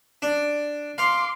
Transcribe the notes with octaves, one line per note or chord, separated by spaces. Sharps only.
D4
F5 C6 D6